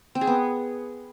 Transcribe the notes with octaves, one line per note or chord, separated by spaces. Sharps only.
C4
G#4
B3